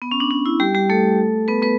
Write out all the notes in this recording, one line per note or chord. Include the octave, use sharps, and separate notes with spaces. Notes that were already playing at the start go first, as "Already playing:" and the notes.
B3
C#4
D4
D4
E4
G3 G4
G3 G4
A3 A4
B3 B4
B3 B4